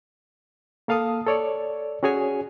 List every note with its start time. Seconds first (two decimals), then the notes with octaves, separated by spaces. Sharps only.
0.88 A#3 A4 F5 A5 D#6
1.26 A4 C#5 D5
2.03 C#4 F#4 G#4 C#5 G#5